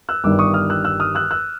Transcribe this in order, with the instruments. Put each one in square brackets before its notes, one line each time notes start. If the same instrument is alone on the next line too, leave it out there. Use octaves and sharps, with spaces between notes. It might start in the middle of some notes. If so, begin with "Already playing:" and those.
[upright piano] E6 F#6
G1 G2 D#3 G3 D6 E6
C#6 D#6
D#6 F6
E6 F#6
E6 F#6
D#6 F6
E6 F#6
E6 F#6